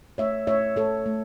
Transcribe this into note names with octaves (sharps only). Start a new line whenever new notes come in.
A3 C#5 E5
A3 C#5 E5
A3 A4 C#5
A3